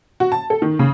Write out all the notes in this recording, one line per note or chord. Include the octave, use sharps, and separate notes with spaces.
F#4
A5
A4
D#3
C#3